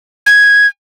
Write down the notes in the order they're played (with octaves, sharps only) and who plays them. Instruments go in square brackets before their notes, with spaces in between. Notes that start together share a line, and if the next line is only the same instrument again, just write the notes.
[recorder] G#6